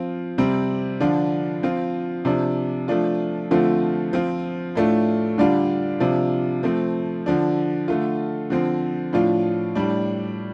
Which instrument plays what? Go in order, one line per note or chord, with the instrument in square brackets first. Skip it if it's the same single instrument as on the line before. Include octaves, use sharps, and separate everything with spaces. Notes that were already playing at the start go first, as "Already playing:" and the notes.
Already playing: [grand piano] F3 C4 F4
C3 G3 C4
D3 F3 D4 F4
F3 C4 F4
C3 F3 D4
F3 A3 D4 F4
D3 F3 A3 C4 F4
F3 C4 F4
A2 A3 D4 F4
D3 G3 D4 F4
C3 F3 D4 F4
F3 A3 C4
D3 F3 D4
D3 A3 F4
D3 F3 C4
A2 F3 D4 F4
A2 G3 D4